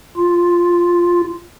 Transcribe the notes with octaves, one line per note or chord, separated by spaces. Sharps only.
F4